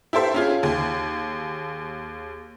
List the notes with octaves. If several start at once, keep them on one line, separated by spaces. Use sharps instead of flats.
E4 G4 A4 C5 E5
C#4 F4 G#4
D#2 G#4